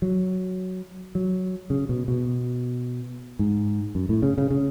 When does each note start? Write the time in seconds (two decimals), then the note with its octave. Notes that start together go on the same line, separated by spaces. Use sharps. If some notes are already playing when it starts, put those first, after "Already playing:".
0.02 F#3
1.15 F#3
1.70 C#3
1.89 B2
2.08 B2
3.39 G#2
3.95 F#2
4.09 A2
4.22 C#3
4.38 C#3
4.50 C#3